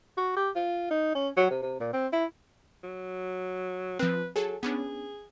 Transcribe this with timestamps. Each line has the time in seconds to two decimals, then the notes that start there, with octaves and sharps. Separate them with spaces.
0.17 F#4
0.36 G4
0.55 F4
0.90 D#4
1.15 C#4
1.36 F#3
1.50 C3
1.62 C3
1.80 A#2
1.93 C4
2.13 E4
2.84 F#3
3.99 F3 C4 B4
4.36 F#3 G#4 A4
4.63 B3 C#4 D4 G#4